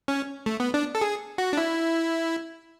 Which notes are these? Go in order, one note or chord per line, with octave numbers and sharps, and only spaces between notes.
C#4
A3
B3
D4
A4
G#4
F#4
D4
E4